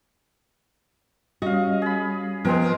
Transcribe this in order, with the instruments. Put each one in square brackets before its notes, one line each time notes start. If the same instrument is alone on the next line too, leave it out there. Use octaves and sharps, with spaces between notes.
[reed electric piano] G3 C#4 [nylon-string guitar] F#4 [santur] D#5 F5
[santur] G#4 B5
[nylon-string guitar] F3 B3 [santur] G#3 C4 A#4